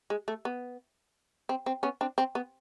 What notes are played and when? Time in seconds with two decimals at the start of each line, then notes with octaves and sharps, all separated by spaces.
0.10 G#3
0.28 A3
0.45 B3
1.49 C4
1.66 C4
1.83 B3 C#4
2.01 C4 D4
2.18 C4
2.35 B3